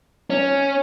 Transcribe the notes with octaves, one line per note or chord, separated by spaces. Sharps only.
C#4